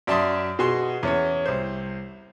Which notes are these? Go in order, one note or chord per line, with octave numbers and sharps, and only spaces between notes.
F#2 D5 E5 A5 C6 D#6
B2 F#4 G#4 C6
E2 C#4 C#5
C2 C5